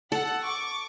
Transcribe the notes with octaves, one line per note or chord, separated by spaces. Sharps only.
A4 F#5
C#6 D6